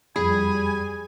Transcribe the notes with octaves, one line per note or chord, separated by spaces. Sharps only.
F2 G3 G#4 G#5 B5